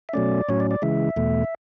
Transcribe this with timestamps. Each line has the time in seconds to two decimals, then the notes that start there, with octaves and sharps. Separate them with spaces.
0.09 E5
0.13 B2 F#3 A3 C#4 D5
0.49 A2 F#3 C#4 C#5
0.60 D5
0.71 D5
0.82 C#3 E3 G#3 E5
1.16 E2 B2 A3